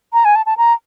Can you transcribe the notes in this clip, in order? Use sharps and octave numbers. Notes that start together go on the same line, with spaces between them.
A#5
G#5
A5
A5
A#5